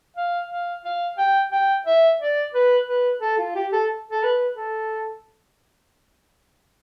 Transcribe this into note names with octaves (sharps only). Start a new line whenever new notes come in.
F5
F5
F5
G5
G5
E5
D5
B4
B4
A4
F4
G4
A4
A4
B4
A4